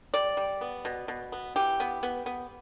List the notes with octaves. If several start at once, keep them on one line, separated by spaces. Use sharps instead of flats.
G3 D5
G3
B3
B2
B2
B3
E3 G4
B3
B3
B3